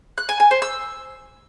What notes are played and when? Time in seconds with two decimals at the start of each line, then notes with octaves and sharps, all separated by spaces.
0.18 F#6
0.29 G#5
0.40 G#5
0.51 C5
0.62 E6